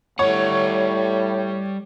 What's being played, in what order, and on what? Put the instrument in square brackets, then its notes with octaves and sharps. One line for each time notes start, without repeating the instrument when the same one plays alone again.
[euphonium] A2 [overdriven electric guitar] G3 F#5 [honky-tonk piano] C#5